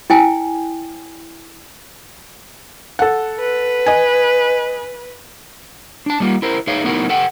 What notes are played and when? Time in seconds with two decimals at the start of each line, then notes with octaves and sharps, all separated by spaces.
0.10 E4 G5 G#5
2.99 A4 F#5
3.40 B4
3.86 D#5 G#5
6.06 D4 A5
6.20 G3 A#3 F4
6.42 E4 A#4 C5
6.67 D#4 G#4 B4 C#5 E5 F5
6.84 A3 B3 D#4 E4 F#4 A#4
7.09 A4 F#5 G5